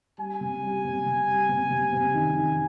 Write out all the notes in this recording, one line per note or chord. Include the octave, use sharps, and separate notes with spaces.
G3 G#5
C3
G3
C3
C3
G3
C3
C3
C3
D#3
D#3